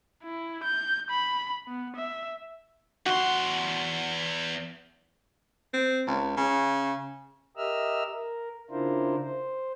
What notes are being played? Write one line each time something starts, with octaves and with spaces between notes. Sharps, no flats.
E4
G6
B5
B3
E5
E2 F#4 C6
C4
C#2
C#3
G4 A#4 D#5 E5 E6 F6
A#4
C#3 D4 E4 F4 A#4 C5
C5